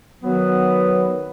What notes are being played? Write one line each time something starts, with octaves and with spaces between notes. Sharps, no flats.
D#3 F#3 B3